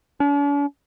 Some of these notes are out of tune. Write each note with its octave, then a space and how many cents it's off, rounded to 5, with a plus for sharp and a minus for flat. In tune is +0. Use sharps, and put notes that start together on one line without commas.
D4 -45